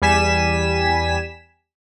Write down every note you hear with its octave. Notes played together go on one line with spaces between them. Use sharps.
E2 G3 G#5 B6 E7